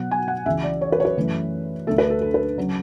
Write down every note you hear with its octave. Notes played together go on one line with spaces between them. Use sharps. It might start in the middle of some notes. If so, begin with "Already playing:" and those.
Already playing: B2 F#3 B3 F#5
G#5
F#5
C#2 C#3 E3 E5
D5
C#5
B4
C#5
B4
F#2 E3 A3
D2 D3 A3 A4
B4
A4
A4
B4
C#3 F#3